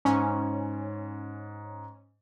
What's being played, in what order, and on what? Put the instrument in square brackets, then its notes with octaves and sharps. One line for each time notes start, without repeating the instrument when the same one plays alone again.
[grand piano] G#2 [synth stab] C#4